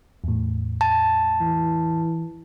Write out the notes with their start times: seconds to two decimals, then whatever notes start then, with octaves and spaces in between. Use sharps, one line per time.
0.24 E2 A2
0.81 A5
1.40 E3